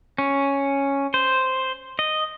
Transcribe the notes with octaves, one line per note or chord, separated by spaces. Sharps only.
C#4
C5
D#5